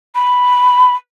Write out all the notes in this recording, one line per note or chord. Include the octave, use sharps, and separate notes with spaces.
B5